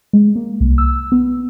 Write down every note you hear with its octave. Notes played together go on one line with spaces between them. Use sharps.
G#3
A#3
C2
E6
B3